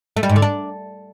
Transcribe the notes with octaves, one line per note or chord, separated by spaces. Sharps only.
A3
G3
G#2
D3
D4